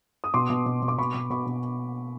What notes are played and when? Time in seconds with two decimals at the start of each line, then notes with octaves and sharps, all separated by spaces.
0.24 D#6
0.34 B2 C6 D6
0.50 B2
0.66 B2
0.82 B2
0.88 D6
0.98 B2 B5 C#6
1.14 B2
1.30 B2 B5 C#6
1.46 B2